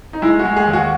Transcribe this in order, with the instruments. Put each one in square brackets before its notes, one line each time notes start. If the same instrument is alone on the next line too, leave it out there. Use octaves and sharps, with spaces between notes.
[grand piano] D#4
G#3 E4
F#4
G#3
G#4
D#2
F#4